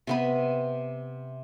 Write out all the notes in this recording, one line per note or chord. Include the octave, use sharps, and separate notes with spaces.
C3 B3 B5